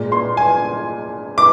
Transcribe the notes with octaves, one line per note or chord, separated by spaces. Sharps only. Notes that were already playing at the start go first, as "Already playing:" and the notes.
Already playing: A#2 G#3
C6
G#5
D6